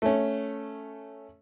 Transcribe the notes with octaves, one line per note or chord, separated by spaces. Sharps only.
A3 C#4